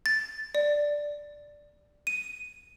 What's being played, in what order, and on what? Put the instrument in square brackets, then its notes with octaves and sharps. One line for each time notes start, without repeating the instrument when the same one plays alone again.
[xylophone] A6
D5
D#7